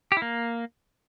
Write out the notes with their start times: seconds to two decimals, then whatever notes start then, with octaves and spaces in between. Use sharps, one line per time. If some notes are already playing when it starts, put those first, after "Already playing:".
0.12 G4
0.17 E4
0.22 A#3